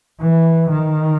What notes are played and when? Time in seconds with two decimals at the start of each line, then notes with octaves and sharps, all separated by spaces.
0.21 E3
0.71 D#3